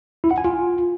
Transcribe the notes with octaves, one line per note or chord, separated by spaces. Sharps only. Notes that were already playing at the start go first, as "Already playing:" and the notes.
E4
F#5
G#5
F4